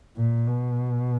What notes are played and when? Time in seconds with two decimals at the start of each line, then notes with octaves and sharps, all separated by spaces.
0.17 A#2
0.47 B2